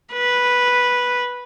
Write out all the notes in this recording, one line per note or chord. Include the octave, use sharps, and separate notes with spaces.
B4